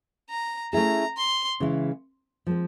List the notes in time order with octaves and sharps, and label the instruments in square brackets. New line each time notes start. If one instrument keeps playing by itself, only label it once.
[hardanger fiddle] A#5
[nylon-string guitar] A3 C#4 E4 G#4 [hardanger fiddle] A#5
[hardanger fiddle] C6
[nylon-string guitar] C#3 E3 G#3 C#4 E4
F3 G#3 C4